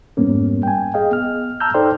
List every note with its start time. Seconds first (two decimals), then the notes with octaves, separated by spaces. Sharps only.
0.17 F2 G#2 G3 A#3 B3 C#4
0.63 G5 G#5
0.94 G#4 D#5 F5 G5
1.11 B3 F6
1.60 A5 A#5 E6 F6 G6
1.74 D#4 A4 C5 D5 G5 C6